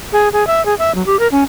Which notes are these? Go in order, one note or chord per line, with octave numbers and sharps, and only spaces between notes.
G#4
G#4
E5
G#4
E5
F#3
G4
A#4
C#4